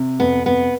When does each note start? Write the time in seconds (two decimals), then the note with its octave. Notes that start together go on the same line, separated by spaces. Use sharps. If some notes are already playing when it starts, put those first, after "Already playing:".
Already playing: C3
0.20 F2 B3
0.46 C3 B3